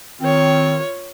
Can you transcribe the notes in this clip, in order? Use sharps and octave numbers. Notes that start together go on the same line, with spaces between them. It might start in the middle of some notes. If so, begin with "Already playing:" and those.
D#3 C4 F4 C#5